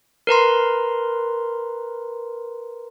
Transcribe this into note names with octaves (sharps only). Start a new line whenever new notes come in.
A#4 B4 A#5 C6